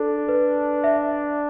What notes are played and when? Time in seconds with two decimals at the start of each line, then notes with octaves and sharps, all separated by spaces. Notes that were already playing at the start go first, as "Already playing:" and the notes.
Already playing: D4 A4
0.29 B4
0.84 E5